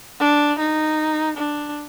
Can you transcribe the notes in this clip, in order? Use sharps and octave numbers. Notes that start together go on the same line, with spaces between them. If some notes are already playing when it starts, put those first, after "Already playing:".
D4
D#4
D4